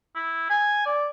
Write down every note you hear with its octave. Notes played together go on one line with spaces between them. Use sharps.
E4
G#5
D5